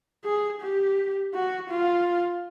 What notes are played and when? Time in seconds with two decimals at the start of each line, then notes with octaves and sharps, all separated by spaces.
0.24 G#4
0.61 G4
1.34 F#4
1.70 F4